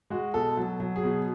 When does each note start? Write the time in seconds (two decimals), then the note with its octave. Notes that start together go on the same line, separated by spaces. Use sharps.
0.10 G#3 F#4
0.34 B2 A4
0.57 F#3
0.80 F#3
0.96 G#4
1.04 B2